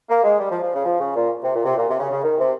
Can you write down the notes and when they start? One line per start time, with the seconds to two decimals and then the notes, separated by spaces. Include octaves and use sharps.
0.09 A#3
0.23 G#3
0.38 G3
0.49 F3
0.61 F3
0.73 C#3
0.85 F3
0.99 C#3
1.15 A#2
1.42 C3
1.54 A#2
1.65 C3
1.76 A#2
1.88 C3
1.99 C#3
2.10 C#3
2.22 D#3
2.38 C3